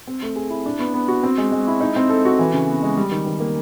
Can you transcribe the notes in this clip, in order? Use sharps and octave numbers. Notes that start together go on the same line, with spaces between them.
C4
A3
G#4
E4
D4
B3
B3
F#4
C4
G#3
G#3
E4
D#4
C4
A4
F#4
E3
C#3
B3
G#3
G3
D#3
D#3
A#3